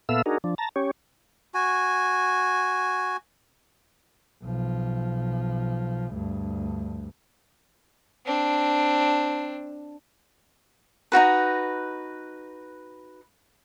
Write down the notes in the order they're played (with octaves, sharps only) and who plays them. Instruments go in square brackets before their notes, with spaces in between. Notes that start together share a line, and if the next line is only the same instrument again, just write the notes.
[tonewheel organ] A#2 B3 A4 E5 F5 E6
D4 D#4 F#4 G#4 A#4
F3 D4
A5 A#5
C#4 G4 C#5
[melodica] F#4 G#5
[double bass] B1 F3
D2 G2
[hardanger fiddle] C4 D4
[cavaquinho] D#4 F4 F#4 B4